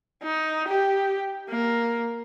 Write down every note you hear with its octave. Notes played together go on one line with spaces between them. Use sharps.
D#4
G4
A#3